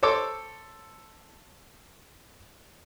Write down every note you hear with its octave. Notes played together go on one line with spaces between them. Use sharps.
A4 C5 C#5 D6 E6